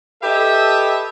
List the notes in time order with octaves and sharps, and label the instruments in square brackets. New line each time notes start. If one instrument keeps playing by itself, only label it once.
[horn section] G4 A4 B4 D#5 E5